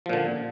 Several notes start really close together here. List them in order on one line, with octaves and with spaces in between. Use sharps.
F3 A#2 D3